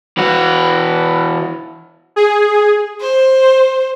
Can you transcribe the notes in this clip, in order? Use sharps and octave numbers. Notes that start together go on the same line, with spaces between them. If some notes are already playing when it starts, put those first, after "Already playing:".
E3 F#4
G#4
C5